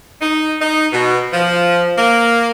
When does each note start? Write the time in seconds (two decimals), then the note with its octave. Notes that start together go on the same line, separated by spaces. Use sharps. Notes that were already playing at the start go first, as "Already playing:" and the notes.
0.21 D#4
0.60 D#4
0.93 B2
1.33 F3
1.98 A#3